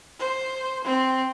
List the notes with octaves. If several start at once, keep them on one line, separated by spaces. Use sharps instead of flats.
C5
C4